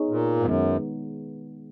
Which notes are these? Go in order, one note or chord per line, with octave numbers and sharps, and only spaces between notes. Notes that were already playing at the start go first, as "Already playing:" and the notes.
Already playing: B3 D#4 G#4 C#5
A#2
G#2
F#2 D#3 G#3 B3